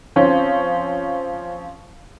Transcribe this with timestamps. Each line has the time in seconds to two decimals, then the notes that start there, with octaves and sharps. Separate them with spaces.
0.16 F3 C4 C#4